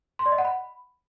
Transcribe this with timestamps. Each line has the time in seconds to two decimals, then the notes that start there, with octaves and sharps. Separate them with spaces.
0.19 C6
0.26 D5
0.32 D#5
0.38 F#5
0.45 B5